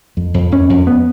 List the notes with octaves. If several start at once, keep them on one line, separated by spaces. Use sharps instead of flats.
F2
F2
F2 C#4
F2
B3